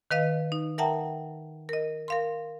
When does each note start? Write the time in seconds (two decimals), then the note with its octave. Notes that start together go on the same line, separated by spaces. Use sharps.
0.11 D#3 B4 D#5 F5
0.52 D#4
0.78 A#4 E5 F#5 G5 A5 A#5
1.69 A#4 D#5
2.08 A#4 F5 C6